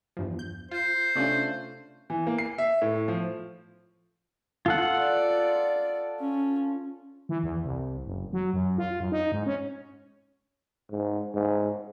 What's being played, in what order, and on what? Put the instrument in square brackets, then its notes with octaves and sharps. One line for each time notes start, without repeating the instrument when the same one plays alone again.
[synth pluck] E2 G2 F3
G6
[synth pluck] F4 [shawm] C5
[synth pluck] C3 C#4 [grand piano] A3 D4 F4
[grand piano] E3
A#3
C7
E5
A2
F3
[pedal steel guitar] F4 A4 F#5
[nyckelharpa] D5
C#4
[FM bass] E3
E2
C2
F#1
F#3
F#2
F4
F#2
D#4
G#2
C#4
[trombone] G#2
G#2